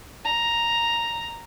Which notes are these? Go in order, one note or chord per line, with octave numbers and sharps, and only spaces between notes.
A#5